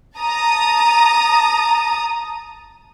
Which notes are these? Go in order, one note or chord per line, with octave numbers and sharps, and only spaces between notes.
A5 A#5 D#6